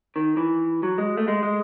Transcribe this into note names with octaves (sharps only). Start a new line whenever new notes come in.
D#3
E3
F#3
G#3
A3
G#3
G#3